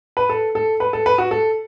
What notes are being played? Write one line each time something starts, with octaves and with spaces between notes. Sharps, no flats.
B4
A4
A4
B4
A4
B4
F#4
A4